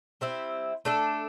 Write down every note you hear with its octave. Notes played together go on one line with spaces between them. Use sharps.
G3 C4 E4
A3 D4 A4